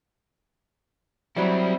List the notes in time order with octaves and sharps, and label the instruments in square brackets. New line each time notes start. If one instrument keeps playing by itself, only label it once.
[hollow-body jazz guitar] F#3 G3 [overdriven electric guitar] C4 E4